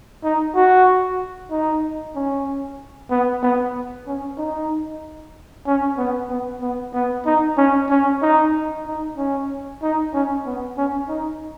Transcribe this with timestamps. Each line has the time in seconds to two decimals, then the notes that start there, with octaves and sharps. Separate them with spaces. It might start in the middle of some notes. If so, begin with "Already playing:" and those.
0.24 D#4
0.55 F#4
1.51 D#4
2.16 C#4
3.11 B3
3.43 B3
4.07 C#4
4.38 D#4
5.67 C#4
5.98 B3
6.30 B3
6.62 B3
6.94 B3
7.26 D#4
7.58 C#4
7.90 C#4
8.22 D#4
8.86 D#4
9.18 C#4
9.82 D#4
10.14 C#4
10.46 B3
10.78 C#4
11.09 D#4